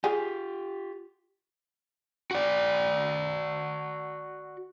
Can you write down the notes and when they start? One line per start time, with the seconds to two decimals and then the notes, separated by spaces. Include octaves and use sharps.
0.04 F4 G4 G#4
2.31 F#4 D5